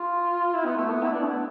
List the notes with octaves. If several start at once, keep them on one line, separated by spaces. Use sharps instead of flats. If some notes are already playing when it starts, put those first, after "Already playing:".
Already playing: F4
E4
B3
A3
B3
E4
D4
B3